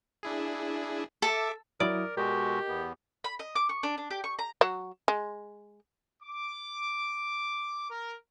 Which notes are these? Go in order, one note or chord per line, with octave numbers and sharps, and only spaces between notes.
D4 E4 G#4
A4 E5 D6
F#3 E4 A#4 D5 D#6
B2 G#3 F#4 G4 A#4 D#5
E2 B3
B5
D#5
D6
C#6
D4
D4
G4
C#6
A#5
F#3 F#4
G#3
D6
A#4